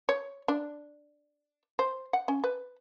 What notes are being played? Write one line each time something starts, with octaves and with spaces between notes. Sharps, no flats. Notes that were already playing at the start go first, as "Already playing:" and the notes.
C#5
D4
C5
F#5
C#4
B4